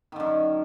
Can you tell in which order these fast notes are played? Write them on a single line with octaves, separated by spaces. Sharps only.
D#3 D3 F#2